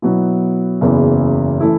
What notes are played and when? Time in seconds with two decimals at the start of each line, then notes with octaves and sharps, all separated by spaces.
0.02 B2 F#3 B3 E4
0.81 F#1 E2 C#3 E3
1.60 E3 A3 E4